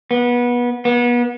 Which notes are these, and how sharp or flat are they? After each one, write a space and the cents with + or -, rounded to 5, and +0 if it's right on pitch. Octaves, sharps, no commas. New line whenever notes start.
B3 -25
B3 -35